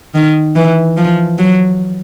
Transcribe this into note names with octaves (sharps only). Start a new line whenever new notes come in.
D#3
E3
F3
F#3